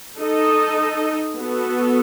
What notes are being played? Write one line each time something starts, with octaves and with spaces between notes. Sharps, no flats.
D#4 A4 D#5
B3 F#4 A4